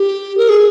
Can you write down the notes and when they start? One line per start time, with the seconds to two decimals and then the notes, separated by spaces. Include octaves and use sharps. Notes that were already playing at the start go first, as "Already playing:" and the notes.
Already playing: G4
0.37 A#4
0.49 G#4